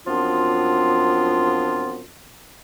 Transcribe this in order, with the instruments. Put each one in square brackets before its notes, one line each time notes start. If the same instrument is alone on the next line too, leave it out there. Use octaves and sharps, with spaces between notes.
[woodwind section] F#2 F3 B3 C4 D4 F4